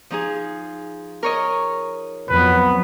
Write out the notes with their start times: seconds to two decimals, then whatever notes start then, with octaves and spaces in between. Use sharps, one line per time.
0.10 F3 D#4 G#4
1.23 A#4 C#5 D#5
2.29 F2 F#3 B3 B4